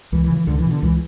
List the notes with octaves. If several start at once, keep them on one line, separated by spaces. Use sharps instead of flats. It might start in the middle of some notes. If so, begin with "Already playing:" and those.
C#2 E3
E3
C#3
E3
C#2 D3
E3
B2
D3
C#2 E3